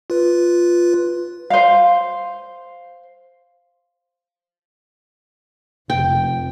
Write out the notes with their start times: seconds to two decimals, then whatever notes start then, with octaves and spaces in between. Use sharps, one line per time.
0.10 F4 B4
1.50 C5 F5
5.90 F1 G5